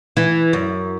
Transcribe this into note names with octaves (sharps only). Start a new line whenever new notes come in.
E3
F#2